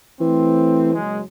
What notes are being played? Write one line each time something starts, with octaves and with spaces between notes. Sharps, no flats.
E3 A3 C4
F#1 F#3 G#3